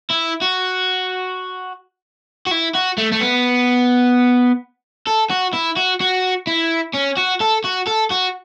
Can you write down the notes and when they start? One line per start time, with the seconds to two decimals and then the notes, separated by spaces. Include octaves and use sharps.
0.11 E4
0.42 F#4
2.47 F#4
2.51 E4
2.75 F#4
2.98 A3
3.12 A3
3.21 B3
5.07 A4
5.30 F#4
5.54 E4
5.77 F#4
6.01 F#4
6.47 E4
6.94 C#4
7.17 F#4
7.40 A4
7.64 F#4
7.87 A4
8.10 F#4